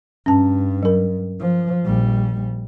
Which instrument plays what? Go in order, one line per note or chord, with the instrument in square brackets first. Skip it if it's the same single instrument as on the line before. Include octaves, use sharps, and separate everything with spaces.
[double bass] G2 [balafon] C#4 A5
[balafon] F#3 A#4
[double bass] F3
A#1 G3